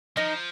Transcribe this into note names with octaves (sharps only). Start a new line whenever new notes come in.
F3 D#4